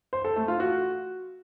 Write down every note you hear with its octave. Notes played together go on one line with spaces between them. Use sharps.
C5
A4
A3
F4
F#4